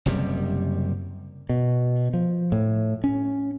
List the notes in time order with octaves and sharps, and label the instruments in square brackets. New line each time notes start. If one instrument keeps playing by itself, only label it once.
[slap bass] F#1 F#2 C3 G3
[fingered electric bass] B2
F3
A2
C#4